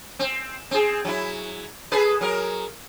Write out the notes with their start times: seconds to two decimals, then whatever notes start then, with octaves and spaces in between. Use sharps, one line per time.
0.19 C4
0.71 C4 G#4
1.05 F#3 E4
1.92 G#4 A4 B4
2.21 F#3 A#4